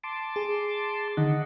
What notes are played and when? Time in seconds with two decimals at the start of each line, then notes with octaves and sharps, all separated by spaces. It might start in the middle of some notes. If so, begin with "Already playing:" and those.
0.04 A5 C6 D6
0.36 G#4
1.17 D3 D#3 D#4 D#5 F#5